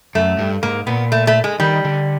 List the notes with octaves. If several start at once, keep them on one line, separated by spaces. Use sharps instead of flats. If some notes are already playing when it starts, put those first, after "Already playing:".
F#2 A3
G2
G#2 A#3
A#2 B3
A3
A3
G#3
D#3 G3
D3